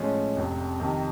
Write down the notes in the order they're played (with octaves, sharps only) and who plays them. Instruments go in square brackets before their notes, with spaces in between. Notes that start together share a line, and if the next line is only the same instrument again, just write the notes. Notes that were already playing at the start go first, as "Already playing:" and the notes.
Already playing: [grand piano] A2 F3 G#3 C#4
F1 F2 C3
F2 C3 D#3